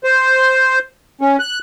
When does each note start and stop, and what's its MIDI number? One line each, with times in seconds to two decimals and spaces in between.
0.04 0.79 72
1.21 1.36 61
1.39 1.59 90